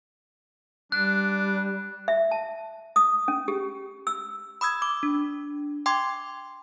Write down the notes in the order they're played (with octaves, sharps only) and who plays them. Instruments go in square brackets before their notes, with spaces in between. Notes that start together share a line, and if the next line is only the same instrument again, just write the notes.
[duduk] G3 [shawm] D4 [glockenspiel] F#6
[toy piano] E5
A5
D#6
C#4
G4
E6
[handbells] B5 D#6 E6 G#6
D6
D4
G5 C6 D6 G#6